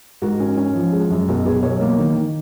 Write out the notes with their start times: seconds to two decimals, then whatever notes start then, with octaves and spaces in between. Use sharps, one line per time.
0.22 G#2 F#4 A#4
0.40 C#4
0.58 C#4
0.75 F3
0.92 G#3
1.10 F#2
1.28 B1 F#4 A#4
1.46 B2 G#4 B4
1.63 B1 A#4 C#5
1.81 A#3
1.98 D#3
2.15 D#3